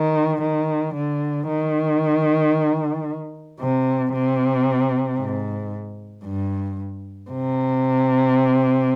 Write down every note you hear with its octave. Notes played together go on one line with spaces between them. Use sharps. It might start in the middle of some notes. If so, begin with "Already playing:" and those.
Already playing: D#3
D#3
D3
D#3
C3
C3
G#2
G2
C3